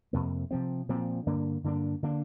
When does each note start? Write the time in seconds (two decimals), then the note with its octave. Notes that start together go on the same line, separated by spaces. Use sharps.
0.13 F2 C3 A#3
0.51 C3 F3 C4
0.89 A#2 F3 C4
1.27 G2 D3 A#3 D4
1.64 G2 D3 A#3 D4
2.03 D3 A#3 D4